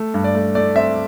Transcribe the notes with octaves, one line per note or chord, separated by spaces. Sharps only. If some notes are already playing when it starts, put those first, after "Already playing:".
Already playing: A3
G2
D5
A3
A3 D5
C4 E5